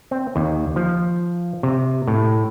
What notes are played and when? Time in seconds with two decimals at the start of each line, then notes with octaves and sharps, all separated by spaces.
0.11 C4
0.36 D#2
0.76 F3
1.63 C3
2.08 A2